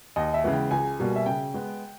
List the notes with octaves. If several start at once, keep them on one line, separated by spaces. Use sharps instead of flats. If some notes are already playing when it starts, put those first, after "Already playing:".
D#2 D#5
E5
C#3 E3 G#3 B3
G5
C#2 G#5
B2 G3 A#3
E5
C#3 G5
G#3 B3